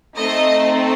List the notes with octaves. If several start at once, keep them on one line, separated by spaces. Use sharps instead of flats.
A3 C4 D#4 D#5